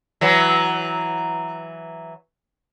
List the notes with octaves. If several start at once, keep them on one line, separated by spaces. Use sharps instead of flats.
E3 F#3